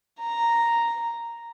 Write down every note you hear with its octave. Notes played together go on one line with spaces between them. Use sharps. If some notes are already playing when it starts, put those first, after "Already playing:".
A#5